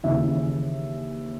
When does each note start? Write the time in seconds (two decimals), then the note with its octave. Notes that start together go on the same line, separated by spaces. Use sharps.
0.03 D#2 C#3 E3 E5